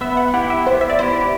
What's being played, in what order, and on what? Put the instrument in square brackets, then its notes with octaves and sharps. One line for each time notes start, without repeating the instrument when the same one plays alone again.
[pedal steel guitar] B3 [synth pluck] E5
[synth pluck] F#5
[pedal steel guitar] E4 G4 [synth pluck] F#5
[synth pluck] E5
[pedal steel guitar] B3 [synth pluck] C5
[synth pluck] E5
D5
[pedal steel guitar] E4 G4 [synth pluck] C5